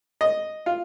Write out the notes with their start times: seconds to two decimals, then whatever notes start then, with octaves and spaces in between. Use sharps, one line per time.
0.21 D#5
0.66 F4